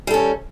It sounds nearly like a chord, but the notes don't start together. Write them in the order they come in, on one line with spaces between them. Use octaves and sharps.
G3 A4 C#4